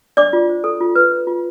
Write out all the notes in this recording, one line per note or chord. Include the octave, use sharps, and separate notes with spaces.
D4 D5 D6
F4
C5
A4
F4
B4
B4
F4